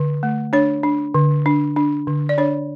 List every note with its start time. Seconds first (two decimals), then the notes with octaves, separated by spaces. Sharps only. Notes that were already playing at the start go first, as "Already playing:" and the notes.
Already playing: D3
0.23 A3
0.53 D4 C#5
0.83 D4
1.14 D3
1.46 D4
1.76 D4
2.07 D3
2.29 D5
2.38 D4 C#5